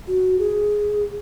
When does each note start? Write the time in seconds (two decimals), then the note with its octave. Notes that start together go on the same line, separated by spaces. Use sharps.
0.07 F#4
0.39 G#4